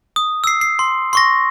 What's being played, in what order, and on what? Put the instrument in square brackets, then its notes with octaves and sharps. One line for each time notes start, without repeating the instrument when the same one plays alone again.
[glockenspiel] D#6
E6 C7
C7
C6
C6 C#6 A#6